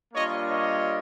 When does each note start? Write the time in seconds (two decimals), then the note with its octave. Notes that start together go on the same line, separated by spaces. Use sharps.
0.14 G3 A#3 D4 F4 C#5 D#5
0.48 C#5 D#5